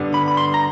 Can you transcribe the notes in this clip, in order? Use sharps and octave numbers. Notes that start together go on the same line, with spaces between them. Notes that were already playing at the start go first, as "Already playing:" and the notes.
Already playing: G2 D3 G3 B3 D4
B5
B5
C6
A#5